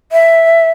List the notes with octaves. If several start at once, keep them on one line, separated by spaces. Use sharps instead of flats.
E5